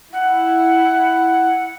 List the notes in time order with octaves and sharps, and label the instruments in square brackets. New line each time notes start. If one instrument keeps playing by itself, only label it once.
[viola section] E4 [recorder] F#5